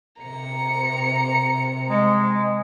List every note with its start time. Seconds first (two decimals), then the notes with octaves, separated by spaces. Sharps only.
0.21 C3 A#5 C#7
1.89 G#3